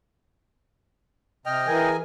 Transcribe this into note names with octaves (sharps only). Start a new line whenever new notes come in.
C3 D#5 G5 F6
E3 G#4 A#4 G#5